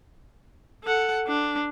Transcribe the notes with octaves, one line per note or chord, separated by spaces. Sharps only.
A4 F#5
D4